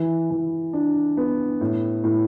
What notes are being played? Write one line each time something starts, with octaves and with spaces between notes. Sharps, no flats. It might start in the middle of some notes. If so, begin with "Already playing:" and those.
Already playing: E3
E3
D4
B3
A2
A2